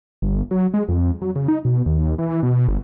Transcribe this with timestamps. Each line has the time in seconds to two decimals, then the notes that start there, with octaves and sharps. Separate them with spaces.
0.22 G1
0.51 F#3
0.74 G#3
0.88 F2
1.22 F#3
1.36 C#3
1.48 D#4
1.65 B2
1.86 D#2
2.18 E3
2.43 B2
2.68 G1